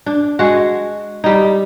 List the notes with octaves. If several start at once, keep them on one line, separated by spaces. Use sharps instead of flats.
D4
G#3 F#4
G3 D#4